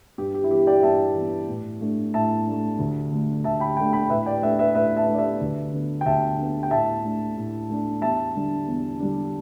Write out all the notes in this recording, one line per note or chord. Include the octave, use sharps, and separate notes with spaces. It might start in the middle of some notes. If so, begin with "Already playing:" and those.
G2 G4
G4
E4
E3 B3 G4
D5 G5
G2 E5 A5
E3 B3
A2
A3 D4
A2 E5 A5
A3 D4
D2
D3 A3 D4
D2 E5 A5
G5 B5
D3 A3 D4 G5 B5
G5 B5
A2 B4 E5
D5 G5
A3 D4 B4 E5
B4 E5
A2 B4 E5
E5 A5
A3 D4
D5
B4 E5
D2
D3 B3
G5
D2 E5 A5
D3 B3
G5
A2 E5 A5
A3 D4
A2
A3 D4
E2 E5 A5
D3 G3 D4
E2
D3 G3 D4